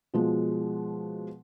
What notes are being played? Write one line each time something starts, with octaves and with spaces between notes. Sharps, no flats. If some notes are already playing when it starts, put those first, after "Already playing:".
B2 F3 G#3